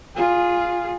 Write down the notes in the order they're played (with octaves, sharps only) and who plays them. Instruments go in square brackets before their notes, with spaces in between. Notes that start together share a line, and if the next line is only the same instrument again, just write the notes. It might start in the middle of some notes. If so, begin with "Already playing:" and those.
[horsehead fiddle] F4 G#4